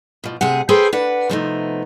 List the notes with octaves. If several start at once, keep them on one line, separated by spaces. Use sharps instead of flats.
B2 F3
D2 C3 G#4 F#5
G#4 A4 B4 C5 G5
D4 B4 F#5
C3 F3 G3 A3 B3 D#4